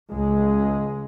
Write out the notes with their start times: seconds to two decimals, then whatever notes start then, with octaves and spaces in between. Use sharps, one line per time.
0.11 C#2 G#3